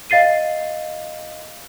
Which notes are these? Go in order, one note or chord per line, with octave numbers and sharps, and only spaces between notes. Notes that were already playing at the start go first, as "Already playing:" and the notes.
D#5 F5 A6 C7 D#7